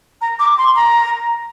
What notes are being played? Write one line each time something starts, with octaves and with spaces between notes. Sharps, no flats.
A#5
D6
C6
A#5